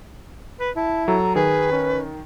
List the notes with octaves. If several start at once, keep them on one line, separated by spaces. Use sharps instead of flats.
B4
E4 A5
F#3 A4 A#5
D#3 G#4 B4
C#4